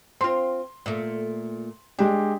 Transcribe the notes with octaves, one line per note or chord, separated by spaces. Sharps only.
C4 F4 C6
A#2 A3
G#3 D4 G4